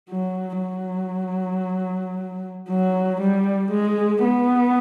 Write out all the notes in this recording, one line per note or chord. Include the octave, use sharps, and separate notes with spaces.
F#3
F#3
F#3
G3
G#3
B3